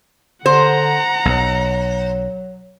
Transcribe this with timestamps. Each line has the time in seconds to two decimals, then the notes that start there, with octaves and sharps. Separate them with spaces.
0.46 D3 C5 F#5 A#5
1.25 B1 F#3